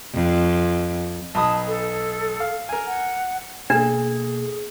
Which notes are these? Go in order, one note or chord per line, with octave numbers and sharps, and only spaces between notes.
F2
B1 A5 B5 D#6
A4
F5
A#4 G#5
F#5
B2 A#3 D4 G#4 A4